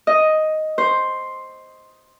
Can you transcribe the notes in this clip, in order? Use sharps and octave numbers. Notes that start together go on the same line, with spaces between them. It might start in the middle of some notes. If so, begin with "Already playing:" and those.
D#5
C5